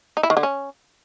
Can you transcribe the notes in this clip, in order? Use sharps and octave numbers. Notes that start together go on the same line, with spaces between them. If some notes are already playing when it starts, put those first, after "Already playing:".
D#4
E4
D#3
D3
C#4